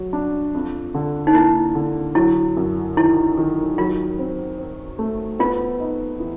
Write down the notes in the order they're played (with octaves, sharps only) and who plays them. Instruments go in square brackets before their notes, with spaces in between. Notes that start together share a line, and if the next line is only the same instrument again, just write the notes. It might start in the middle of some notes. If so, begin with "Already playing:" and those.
Already playing: [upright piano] F#3 F#4
D4
F2
D3
[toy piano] D#4
[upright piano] A#3 [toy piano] E4
[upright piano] D3
[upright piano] F#3 [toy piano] E4
[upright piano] F#2
[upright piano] D#3 [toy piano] E4
[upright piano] D#3
[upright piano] F#3 [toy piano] F4
[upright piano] C4
C4
A3
[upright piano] B3 [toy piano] F4
[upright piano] D#4
E3